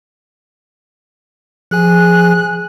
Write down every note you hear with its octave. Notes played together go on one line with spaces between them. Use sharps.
F3 G#4 G#5 F#6